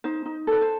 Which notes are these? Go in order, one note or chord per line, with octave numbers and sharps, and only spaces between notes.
D#4 C5
D#4
A4 B4
C5